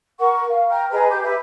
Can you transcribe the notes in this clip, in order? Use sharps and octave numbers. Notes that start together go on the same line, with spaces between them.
A#4 F#5 C#6
F5
G5 A#5 F6
G#4 B4 D#5 A#5
G4 D6 G6
B4 E5